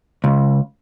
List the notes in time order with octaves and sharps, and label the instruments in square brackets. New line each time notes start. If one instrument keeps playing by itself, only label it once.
[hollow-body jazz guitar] C#2